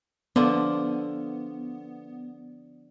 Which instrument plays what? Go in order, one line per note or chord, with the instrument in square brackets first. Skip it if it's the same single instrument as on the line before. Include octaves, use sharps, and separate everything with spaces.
[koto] D3 F3 [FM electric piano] B3